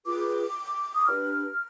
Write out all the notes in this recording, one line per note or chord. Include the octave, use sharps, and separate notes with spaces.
F4 G#4 B4 D6
D#6
D4 G4 B4 F6